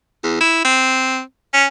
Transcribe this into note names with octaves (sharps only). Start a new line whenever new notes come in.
E2
E4
C4
C#4